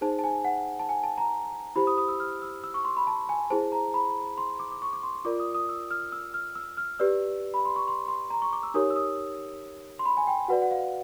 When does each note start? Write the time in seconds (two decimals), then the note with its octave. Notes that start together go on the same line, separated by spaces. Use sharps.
0.01 D#4 G#4 C5 A5
0.19 A5
0.24 G#5
0.45 F#5
0.80 A5
0.89 G#5
1.04 A5
1.18 A#5
1.76 E4 G4 C5 B5
1.87 D#6
1.98 D#6
2.08 E6
2.20 F6
2.42 E6
2.64 E6
2.74 C#6
2.85 C6
2.97 B5
3.07 A5
3.29 G#5
3.50 E4 G#4 C5 A5
3.72 A#5
3.94 B5
4.38 C6
4.59 D6
4.72 D6
4.82 C#6
4.93 D6
5.03 C6
5.25 F4 A#4 D5 D6
5.40 D#6
5.55 D#6
5.69 E6
5.91 F6
6.12 E6
6.34 F6
6.55 E6
6.77 F6
6.99 G4 B4 D5 E6
7.54 B5
7.65 C6
7.76 C#6
7.88 C6
8.08 C6
8.30 A#5
8.42 C#6
8.53 D6
8.63 E6
8.74 D#4 G4 A#4 C#5 D#6
8.90 E6
8.96 D#6
9.99 C6
10.06 B5
10.17 G#5
10.27 G5
10.48 F#4 B4 D5 F#5
10.62 F#5
10.71 F5